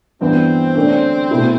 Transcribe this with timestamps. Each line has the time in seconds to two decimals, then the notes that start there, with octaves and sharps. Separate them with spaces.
0.21 G2 E3 B3 C4
0.75 F#2 D3 A3 D4
1.31 B2 A3 E4